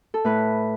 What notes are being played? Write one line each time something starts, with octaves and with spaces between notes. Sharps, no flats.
A4
A2 B4